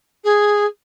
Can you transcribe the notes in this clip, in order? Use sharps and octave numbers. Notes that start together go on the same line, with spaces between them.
G#4